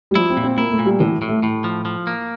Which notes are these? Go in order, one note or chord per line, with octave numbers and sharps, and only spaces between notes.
G3
F3 E4
C4
A#2
C4
A#3 E4
A3
A#2
G3
A2 E3
A2
A3
A2
F3
F3
A#3